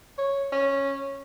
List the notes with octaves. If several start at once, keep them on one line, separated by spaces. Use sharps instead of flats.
C#5
C#4